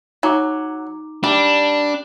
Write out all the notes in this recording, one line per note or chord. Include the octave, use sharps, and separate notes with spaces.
F#3 D#4 A#5 D6
G3 D4